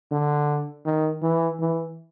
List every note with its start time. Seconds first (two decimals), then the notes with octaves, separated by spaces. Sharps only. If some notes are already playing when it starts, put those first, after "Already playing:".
0.11 D3
0.86 D#3
1.22 E3
1.60 E3